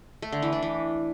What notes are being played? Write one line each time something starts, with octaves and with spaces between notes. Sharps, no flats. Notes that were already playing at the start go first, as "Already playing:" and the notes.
A3
D3
E3
D4
E3